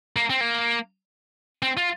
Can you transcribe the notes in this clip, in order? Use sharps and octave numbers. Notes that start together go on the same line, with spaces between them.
A#3
C4
A#3
C4
F4